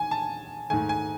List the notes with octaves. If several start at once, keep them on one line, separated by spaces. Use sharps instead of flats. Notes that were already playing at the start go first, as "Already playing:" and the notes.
Already playing: E2 D#3 G#5
A5
G#2 D#3 A3 G#5
G#5